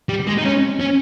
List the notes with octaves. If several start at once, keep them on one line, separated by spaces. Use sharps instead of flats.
G3
G#3
D#4
C#4
C#4